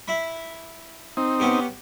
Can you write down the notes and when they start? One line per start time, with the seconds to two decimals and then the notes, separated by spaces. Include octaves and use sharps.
0.08 E4 E5 B5
1.17 C4 D#4
1.40 B3 C#4 G4